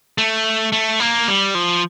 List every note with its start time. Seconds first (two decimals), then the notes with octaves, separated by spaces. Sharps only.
0.18 A3
0.72 A3
1.00 A#3
1.28 G3
1.55 F3